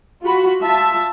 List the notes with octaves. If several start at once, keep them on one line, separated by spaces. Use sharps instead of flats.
F4 F#4 B5
F4 E5 A5